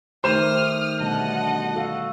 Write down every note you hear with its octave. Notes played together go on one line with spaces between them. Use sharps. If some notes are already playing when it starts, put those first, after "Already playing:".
D#3 A3 G4 C5 D#6 F6 E7
B2 D3 G3 A3 D#5 F#5 A5
F#4 A4 F5